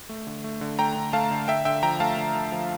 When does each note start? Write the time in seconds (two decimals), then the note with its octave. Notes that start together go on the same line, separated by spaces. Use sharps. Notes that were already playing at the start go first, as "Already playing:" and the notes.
0.09 A3
0.27 D3
0.44 A3
0.61 D3
0.79 A3 G5 A#5
0.96 D3
1.13 A3 F5 A5
1.31 D3
1.48 D3 E5 G5
1.65 D3 E5 G5
1.83 F3 G5 A#5
2.00 A3 F5 A5
2.17 D3
2.35 D3
2.52 F3